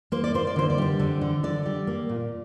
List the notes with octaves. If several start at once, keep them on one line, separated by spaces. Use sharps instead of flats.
A#3 C5
D5
A#3 C5
D5
D3 C5
D5
G3 C5
D3
D3
D3 D5
G3
A#3
A#2